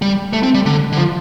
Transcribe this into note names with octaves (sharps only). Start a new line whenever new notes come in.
G3
A3
C4
G3
D3
D3
F3